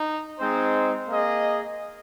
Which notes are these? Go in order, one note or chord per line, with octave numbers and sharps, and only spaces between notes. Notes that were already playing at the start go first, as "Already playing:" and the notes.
Already playing: D#4
G#3 C4 D#4 C5
A#3 G#4 D#5